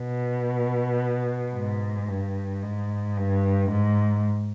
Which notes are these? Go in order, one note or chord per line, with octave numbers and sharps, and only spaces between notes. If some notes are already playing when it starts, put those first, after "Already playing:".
Already playing: B2
G#2
G2
G#2
G2
G#2